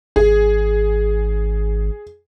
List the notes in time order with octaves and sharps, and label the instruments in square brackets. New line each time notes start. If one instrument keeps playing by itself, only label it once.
[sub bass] G#1 [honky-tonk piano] G#4